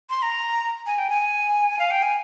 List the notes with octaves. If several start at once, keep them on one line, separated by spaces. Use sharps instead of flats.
C6
A#5
G#5
G5
G#5
F5
G5
G#5